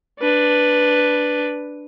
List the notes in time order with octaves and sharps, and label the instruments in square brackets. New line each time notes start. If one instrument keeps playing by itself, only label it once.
[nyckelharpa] D4 B4